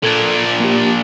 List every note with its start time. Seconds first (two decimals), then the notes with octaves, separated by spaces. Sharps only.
0.03 A#2 D4 A4 G#6
0.60 A#3 G4